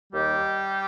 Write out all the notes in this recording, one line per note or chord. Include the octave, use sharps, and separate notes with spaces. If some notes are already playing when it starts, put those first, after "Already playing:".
D#2 D#3 G3 G4